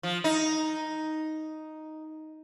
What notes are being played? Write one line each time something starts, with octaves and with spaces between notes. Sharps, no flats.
F3
D#4